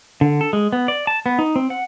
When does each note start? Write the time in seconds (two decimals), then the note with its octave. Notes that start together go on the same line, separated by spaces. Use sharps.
0.21 D3
0.41 A4
0.53 G#3
0.73 B3
0.88 D5
1.07 A5
1.26 B3
1.39 D#4
1.56 C4
1.70 F#5